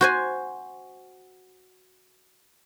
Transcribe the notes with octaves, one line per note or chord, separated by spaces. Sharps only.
F#4 C5 G#5